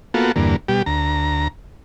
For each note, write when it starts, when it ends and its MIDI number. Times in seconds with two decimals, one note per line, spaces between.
0.14 0.32 58
0.14 0.32 59
0.14 0.32 65
0.14 0.32 66
0.14 0.32 69
0.36 0.56 40
0.36 0.56 43
0.36 0.56 50
0.36 0.56 58
0.68 0.82 47
0.68 0.82 55
0.68 0.82 67
0.86 1.48 38
0.86 1.48 82